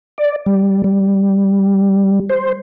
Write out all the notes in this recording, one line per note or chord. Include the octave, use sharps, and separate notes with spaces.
D5
G3
G3
C5